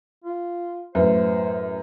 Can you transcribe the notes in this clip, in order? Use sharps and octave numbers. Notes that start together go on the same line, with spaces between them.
F4
F#2 A2 E4 B4 C5 E5